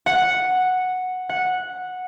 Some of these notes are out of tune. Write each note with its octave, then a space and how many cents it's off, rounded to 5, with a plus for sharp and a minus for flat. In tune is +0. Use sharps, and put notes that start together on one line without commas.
F#5 -5
F#5 -10